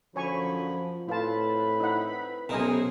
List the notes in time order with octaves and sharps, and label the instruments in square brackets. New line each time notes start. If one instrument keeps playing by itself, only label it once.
[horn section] F#2 D3 B5 [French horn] F3 [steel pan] C#5 G#5 C#6
[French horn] A2 [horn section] C4 B4 B5 [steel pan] F4 A5
[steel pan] D#4 E4 F#5
[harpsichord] B1 C3 [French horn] C#4 [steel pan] A#4 D#5 G#5